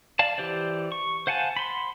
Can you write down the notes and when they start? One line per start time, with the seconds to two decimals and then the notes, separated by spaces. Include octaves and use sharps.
0.19 D5 F5 A5
0.38 E3 G4 C5 D5
0.92 C#6
1.27 C5 F5 F#5 G#5 A5
1.57 B5 C6